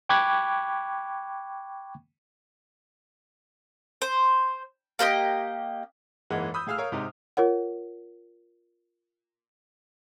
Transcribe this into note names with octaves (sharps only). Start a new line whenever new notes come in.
G5 B5 C#6 D6 F#6 G#6
C5
A#3 G4 B4 D#5
F#1 G#2 E3 G#3 A#3 F#5
B5 D#6 E6 G6
A2 G#4 F5 E6 F6
A#4 C#5 F5
G#2 C3 D#4
F4 A#4 C#5 F#5